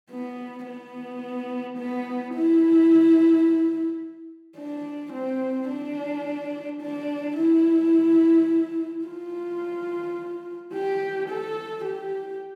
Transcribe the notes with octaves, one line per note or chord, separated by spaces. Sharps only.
B3
B3
B3
E4
D4
C4
D4
D4
E4
F4
G4
A4
G4